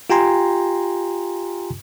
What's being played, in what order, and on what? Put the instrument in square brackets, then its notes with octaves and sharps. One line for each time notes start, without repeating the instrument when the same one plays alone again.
[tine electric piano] F4 G4 G5 G#5 A#5 C6